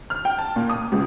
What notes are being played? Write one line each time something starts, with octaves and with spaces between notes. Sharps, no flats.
F6
G5
A5
A#2
D#6
C#2